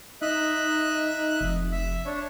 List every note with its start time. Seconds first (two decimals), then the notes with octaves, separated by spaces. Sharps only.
0.22 D#4 D#5 E5 F#6
1.41 F1
1.72 E5
2.06 D4 C#5